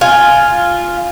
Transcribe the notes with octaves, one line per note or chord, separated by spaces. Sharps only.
F4 G#5